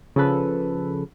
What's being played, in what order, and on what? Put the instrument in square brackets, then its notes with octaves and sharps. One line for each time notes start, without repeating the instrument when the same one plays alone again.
[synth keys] C#3 F3 A4 B4